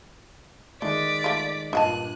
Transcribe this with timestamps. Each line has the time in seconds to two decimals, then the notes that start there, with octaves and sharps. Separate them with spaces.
0.82 D#3 G#3 A3 D5 B6
1.24 A3 F4
1.73 G2 A#2 D#4 F#5 A5 F#6 D#7